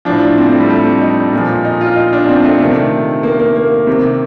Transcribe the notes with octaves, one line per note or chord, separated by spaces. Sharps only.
A2 F3 D4
C4
A3
G3
A3
D#4
A#2 F3
D#4
F4
D#4
D4
C4
A3
C3 D#3 A3
A#3
A#3
A#3
C3 D#3